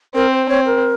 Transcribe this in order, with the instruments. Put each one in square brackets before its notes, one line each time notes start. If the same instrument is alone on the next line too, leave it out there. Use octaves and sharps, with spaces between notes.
[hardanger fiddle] C4 [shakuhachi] A#4
[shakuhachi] C5
[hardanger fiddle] C4 [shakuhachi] C#5
[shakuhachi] A#4